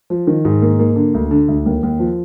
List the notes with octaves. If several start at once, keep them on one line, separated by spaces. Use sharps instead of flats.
F3
D#3
G#2
A#3
A#3
D3
D2
D3
D2
D#2
D#2
F3